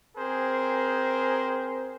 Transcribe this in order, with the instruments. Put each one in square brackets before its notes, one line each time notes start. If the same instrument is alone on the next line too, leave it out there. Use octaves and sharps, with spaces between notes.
[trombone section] C4 G#4 A#4 C5